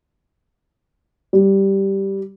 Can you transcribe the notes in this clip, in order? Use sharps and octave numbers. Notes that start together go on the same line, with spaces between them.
G3